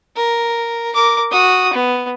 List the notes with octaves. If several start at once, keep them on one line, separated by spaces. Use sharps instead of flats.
A#4
A#4 D6
F#4 D#6
B3